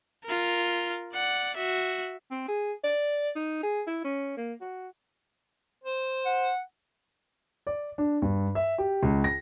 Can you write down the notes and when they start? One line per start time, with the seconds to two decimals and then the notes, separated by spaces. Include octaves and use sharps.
0.25 F4 A#4
1.14 D5 F#5
1.56 F#4 E5
2.31 C4
2.48 G#4
2.84 D5
3.36 D#4
3.63 G#4
3.87 E4
4.04 C#4
4.37 A#3
4.61 F#4
5.84 C5
6.25 F#5
7.67 D5
7.98 D4
8.22 G2
8.55 E5
8.78 G4
9.03 C#2
9.24 A#6